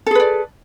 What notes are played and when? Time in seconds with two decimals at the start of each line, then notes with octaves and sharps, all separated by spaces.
0.07 A4
0.11 G#4
0.15 B4
0.20 D5